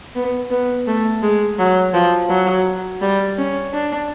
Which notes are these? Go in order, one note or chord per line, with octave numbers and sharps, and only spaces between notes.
B3
B3
A3
G#3
F#3
F3
F#3
G3
C#4
D4